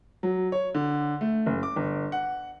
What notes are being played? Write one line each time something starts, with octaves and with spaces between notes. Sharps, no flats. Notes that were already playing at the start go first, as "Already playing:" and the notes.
F#3
C#5
D3
A3
F#1
D6
G1
F#5